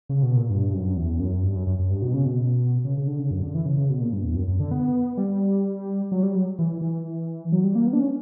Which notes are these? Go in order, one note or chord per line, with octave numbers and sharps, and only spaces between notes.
C#3
B2
A#2
G2
F#2
E2
F#2
G2
F#2
F#2
F#2
G2
B2
C#3
B2
C#3
C#3
D3
C#3
F#2
D3
E3
C#3
C#3
B2
A#2
G2
E2
F#2
F#2
D3
B3
G3
F#3
G3
F#3
E3
E3
F#3
G3
A#3
B3
D4
C#4